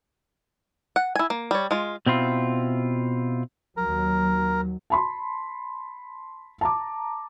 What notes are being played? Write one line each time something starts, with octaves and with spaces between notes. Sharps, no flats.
F#5
E4 G#5
A#3
G3 C#5
G#3 F4
B2 C4 E4 F4
D#2 F#3 A#4
A5 B5 C6
A5 A#5 D6